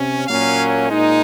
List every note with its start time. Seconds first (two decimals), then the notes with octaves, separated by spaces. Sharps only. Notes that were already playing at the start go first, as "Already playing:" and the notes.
Already playing: C3 C#4
0.27 A#2 F#3 A#3 C#4 F5
0.90 A#2 G#3 D#4